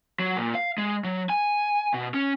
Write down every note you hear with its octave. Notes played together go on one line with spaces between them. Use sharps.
F#3
A#2
F5
G#3
F#3
G#5
B2
C#4